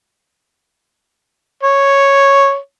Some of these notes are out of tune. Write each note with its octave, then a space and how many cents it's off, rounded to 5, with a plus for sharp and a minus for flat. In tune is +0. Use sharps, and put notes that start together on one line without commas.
C#5 -5